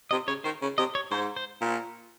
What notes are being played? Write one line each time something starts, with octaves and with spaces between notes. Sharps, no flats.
C3 D#5
C#3 C#5
D#3 C5
C#3
C3 D#5
C#5
G#2 C5
C5
A#2